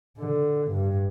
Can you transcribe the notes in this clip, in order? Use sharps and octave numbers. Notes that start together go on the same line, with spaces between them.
D3
G2